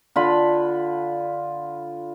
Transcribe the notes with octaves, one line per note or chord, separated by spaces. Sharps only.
D3 F4 B5